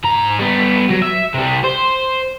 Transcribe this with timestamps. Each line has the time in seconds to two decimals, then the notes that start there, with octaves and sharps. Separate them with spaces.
0.04 G#2 A#5
0.39 G3 B3
0.90 F#3
1.02 E5
1.34 C3 G3
1.64 C5